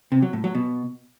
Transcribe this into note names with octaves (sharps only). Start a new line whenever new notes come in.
C3
F#3
A2
F#3
B2